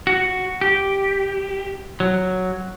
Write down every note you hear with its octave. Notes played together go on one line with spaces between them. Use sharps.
F#4
G4
F#3